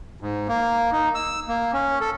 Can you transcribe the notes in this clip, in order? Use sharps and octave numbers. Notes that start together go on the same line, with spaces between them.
G#2
A#3
D#4
E6
A#3
C#4
A4